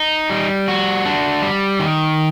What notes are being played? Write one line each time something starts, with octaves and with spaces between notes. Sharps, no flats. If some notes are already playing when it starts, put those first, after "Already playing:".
Already playing: D#4
G3
F#4
D4
G3
D#3